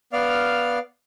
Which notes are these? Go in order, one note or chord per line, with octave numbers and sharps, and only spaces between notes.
B3 D5 F5 F6